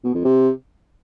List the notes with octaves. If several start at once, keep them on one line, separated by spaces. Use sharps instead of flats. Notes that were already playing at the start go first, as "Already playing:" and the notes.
B2
F2
C3